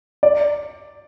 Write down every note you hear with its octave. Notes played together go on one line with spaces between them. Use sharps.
D5